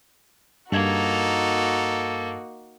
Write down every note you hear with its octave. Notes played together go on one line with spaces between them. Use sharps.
G2 A#3 D#4 F#4 A4 G#6